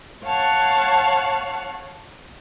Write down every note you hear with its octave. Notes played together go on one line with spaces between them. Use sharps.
C#5 F5 F#5 A5 C#6